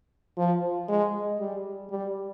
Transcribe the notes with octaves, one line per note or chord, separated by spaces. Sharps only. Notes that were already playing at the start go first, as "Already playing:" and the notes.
F3
G#3
G3
G3